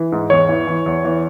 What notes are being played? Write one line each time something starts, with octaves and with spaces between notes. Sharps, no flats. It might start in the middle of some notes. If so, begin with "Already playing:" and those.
Already playing: E3
G#2
E2 C#5
E3
E3
E2
E3